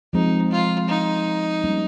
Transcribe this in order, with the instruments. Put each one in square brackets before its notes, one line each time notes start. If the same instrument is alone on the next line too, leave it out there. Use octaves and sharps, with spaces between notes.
[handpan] F3 G#3 C4 [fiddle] D#4
[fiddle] F4
D#4
[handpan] G3 A#3 C#4